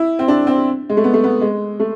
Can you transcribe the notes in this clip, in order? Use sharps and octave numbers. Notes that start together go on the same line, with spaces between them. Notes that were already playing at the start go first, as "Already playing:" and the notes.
Already playing: E4
C4
D4
C4
G#3
A3
B3
A3
B3
G#3
A3